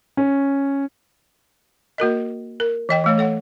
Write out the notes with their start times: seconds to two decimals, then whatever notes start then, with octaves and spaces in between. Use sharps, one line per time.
0.17 C#4
1.98 A#3 F#4 A#4 D#5
2.60 A#4
2.89 E3 D#5 G5
3.04 E3 A3 C#5
3.18 A4 C#5 F#5